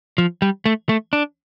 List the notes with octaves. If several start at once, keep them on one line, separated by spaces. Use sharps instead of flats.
F3
G3
A3
A3
D4